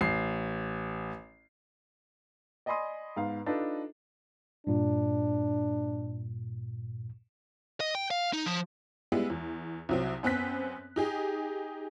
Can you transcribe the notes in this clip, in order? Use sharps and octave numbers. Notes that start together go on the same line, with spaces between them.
A1 C7
D5 D#5 G#5 B5 C6 D#6
G#2 B3 F5
D4 D#4 F4 A4 B4 D#5
G2 A#2 D4
D#5
G5
F5
D#4
F3
G3 G#3 B3 E4
E2
C2 F#3 C4
F#2 B3 C4 F#6 B6
D#4 G4 G#4